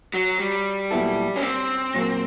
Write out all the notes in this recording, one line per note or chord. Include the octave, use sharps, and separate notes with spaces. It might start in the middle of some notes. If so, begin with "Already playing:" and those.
F#3
G3
A#2 F#3 B3 E4 A4
C#4
C4
A#2 F#3 A#3